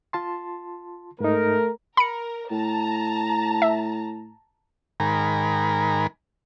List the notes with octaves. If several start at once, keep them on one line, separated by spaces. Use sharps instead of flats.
F4 A5 C6
G#2 A3 D#4 A#4
A#4 B5 C#7
A2 A5 A#5
E5
G#2 D#3 A#4 G#5 A#5 B5